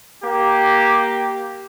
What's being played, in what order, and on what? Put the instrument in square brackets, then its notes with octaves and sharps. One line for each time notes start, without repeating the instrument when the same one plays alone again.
[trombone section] A#3 G4